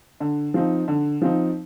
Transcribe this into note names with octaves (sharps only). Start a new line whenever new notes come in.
D3
F3 C4 D#4
D3
F3 C4 D#4